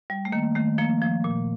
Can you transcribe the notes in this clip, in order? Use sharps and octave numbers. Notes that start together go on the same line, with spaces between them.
G3
A3
D#3 A#3
D#3 A3
F3 A#3
F3
A#2